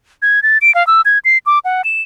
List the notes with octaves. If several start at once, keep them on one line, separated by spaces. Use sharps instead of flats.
G#6
A6
D7
F5
E6
G#6
C7
D6
F#5
E7